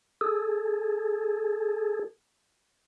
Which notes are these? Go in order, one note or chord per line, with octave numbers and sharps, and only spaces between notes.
G#4 A4